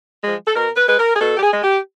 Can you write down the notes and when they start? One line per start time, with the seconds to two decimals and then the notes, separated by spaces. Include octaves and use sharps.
0.22 F3 G#3
0.46 A4
0.55 B2 A#4
0.76 B4
0.87 G#3 B4
0.98 A#4
1.15 G#4
1.20 B2 A4
1.37 G4
1.42 G#4
1.52 G#3
1.63 G4